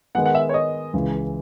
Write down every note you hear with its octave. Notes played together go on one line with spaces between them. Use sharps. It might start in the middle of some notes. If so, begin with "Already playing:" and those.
D#3 G#3 B3 F#5
F#5
E5
C#5
D#5
C#2 C#3 E3